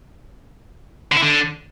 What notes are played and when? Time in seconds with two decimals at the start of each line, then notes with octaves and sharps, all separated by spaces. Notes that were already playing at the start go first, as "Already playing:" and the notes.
1.12 D3
1.17 E4
1.22 D3